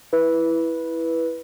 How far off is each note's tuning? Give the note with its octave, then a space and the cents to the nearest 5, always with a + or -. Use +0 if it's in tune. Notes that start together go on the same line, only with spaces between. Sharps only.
E4 +0 B4 -10